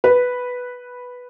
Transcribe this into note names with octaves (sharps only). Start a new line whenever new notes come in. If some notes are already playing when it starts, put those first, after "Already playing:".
B4